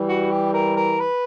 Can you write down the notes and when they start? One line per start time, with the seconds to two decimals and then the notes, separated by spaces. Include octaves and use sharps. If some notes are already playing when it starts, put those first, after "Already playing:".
Already playing: E3 G3
0.09 F#4
0.31 G4
0.53 A#4
0.77 A#4
0.99 B4